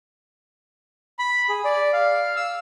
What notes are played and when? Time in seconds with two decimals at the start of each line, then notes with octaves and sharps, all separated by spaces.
1.19 B5
1.49 G#4
1.65 D5
1.93 F5
2.36 E6